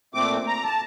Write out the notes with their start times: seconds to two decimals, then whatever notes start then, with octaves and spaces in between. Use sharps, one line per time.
0.14 A#2 A3 C4 D6
0.47 A#5
0.64 A5